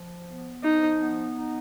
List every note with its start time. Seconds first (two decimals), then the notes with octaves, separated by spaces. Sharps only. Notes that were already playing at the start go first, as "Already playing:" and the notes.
Already playing: F3
0.27 B3
0.64 F3 D#4
1.00 B3
1.36 D#4